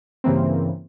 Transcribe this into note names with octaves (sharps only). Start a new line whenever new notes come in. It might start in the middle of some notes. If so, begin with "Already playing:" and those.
G2 C#3 E3 A#3 C4